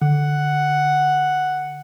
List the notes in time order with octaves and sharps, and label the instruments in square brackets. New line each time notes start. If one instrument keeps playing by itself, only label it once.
[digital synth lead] D3 [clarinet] F#5